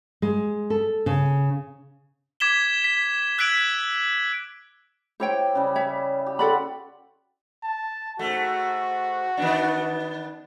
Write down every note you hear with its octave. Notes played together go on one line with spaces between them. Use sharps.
G#3
A4
C#3
D6 G#6 B6 E7 G7
B6
E6 F#6 G#6 B6 D7 F#7
E4 G4 C5 C#5 G5
C#3 G3
C#5 E5
G4
F#4 A4 D5 B5 C6
A5
G#2 A3 F#4
D#3 B3 D4